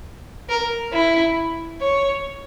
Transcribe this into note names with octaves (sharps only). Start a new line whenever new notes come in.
A#4
E4
C#5